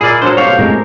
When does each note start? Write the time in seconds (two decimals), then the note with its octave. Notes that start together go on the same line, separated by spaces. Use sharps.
0.01 A#2 E4 G#4 A#4 D5 D#5
0.22 D3 F#3 G#3 A4 C5
0.37 B2 A3 C4 G4 C#5 F5
0.59 A2 C3 G#3 A#4